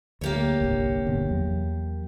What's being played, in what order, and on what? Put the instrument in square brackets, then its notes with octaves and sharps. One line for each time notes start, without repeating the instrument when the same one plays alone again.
[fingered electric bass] D2 [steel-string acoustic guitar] A#3 G4 C#5
[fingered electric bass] G1 C2
G1 B2 D3
E2 F#3